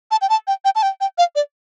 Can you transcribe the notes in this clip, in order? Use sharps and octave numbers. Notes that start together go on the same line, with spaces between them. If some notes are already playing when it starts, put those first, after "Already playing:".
A5
G5
A5
G5
G5
A5
G5
G5
F5
D5